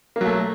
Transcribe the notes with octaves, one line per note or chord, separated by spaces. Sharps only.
F#3 A3 A#3